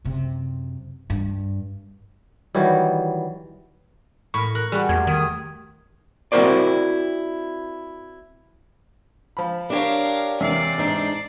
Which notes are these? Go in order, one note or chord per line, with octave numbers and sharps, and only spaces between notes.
F#2 C3
G2
D#3 E3 F#3 G3
A2 A#4 B5 C#6
A#4 F#6
G3 F#4 G#4
E2 A3 G4 G#6
D#3 D#6
C4 E4 F#4 A#4 C5 D5
F3 B5
D4 G4 A#4 C#5 F5
E2 C3 A#3 D5 C7
G#2 D4 D#4